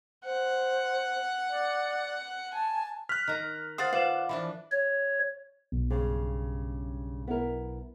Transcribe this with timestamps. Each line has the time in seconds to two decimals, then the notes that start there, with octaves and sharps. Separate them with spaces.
0.25 C5 F#5
1.50 D5
2.53 G#5 A5
3.09 F6 F#6 B6
3.27 D#3 A#5
3.78 C5 F5 F#5 D#6 A6 C7
3.93 F4 B4 C5 D5 F#5 E7
4.29 E3 F3 D4 B5
4.72 C#5
5.72 B1
5.90 G2 C#3
7.27 B3 E4 A#4